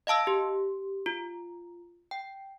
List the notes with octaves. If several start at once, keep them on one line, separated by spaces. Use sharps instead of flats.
D#5 F5 A5 E6
G4
F4
G5